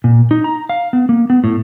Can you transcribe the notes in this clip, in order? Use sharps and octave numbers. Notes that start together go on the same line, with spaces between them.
A#2
D#4
A#5
F5
B3
A#3
B3
A2